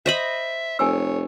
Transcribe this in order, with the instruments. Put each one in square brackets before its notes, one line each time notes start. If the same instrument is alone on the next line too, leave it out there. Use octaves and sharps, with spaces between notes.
[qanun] C5 D#5 B5 [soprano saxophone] E5
[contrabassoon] F1 [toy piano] A4 G#5 E6 [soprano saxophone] C#5